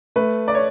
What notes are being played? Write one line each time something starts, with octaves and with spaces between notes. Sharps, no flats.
A3 B4
D5
C#5